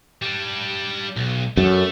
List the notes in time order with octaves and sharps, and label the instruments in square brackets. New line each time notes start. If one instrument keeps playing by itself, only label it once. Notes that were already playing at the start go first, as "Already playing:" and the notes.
[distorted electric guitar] G3 D4
B1
[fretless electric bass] F#2 [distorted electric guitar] A3